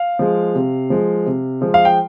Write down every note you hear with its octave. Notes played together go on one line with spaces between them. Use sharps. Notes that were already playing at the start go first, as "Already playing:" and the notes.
Already playing: F5
F3 G#3
C3
F3 G#3
C3
F3 G#3
F5
G5